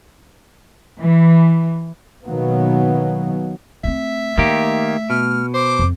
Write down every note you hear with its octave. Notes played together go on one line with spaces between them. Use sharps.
E3
B2 D#3 F#3 A#3 B3
A3 C4 E5
D#3 A3 A#3 G4
B2 F6
C5 D6
F2